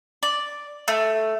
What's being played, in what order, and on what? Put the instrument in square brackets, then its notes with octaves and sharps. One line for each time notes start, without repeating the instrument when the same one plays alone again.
[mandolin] D5
A3